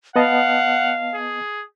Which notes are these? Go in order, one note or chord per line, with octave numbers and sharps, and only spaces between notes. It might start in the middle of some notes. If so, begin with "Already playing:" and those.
B3 D#5 F5 F#5 A5
G#4